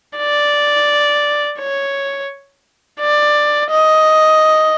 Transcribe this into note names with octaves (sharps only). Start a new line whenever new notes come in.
D5
C#5
D5
D#5